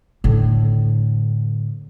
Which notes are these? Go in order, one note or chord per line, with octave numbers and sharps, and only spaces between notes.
A2 D3